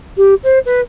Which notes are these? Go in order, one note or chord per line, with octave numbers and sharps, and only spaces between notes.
G4
C5
B4